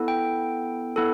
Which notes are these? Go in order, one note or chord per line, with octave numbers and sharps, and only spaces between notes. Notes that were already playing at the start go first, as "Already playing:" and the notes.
Already playing: B3 E4 A4
G5
B3 E4 A4